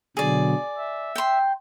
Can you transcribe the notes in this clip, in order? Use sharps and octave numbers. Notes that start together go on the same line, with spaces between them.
B2 D3 F#3 G#4 D5
E5
G5 C6